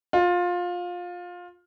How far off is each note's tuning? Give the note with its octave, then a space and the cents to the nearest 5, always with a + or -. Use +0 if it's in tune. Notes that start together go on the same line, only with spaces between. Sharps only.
F4 +20